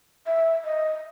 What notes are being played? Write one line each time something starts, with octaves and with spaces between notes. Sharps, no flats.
E5
D#5